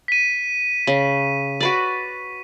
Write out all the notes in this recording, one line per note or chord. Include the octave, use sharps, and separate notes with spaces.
B6 D#7
C#3
F#4 B4 D5